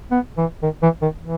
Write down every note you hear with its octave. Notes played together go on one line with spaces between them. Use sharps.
B3
E3
D#3
E3
D#3
E3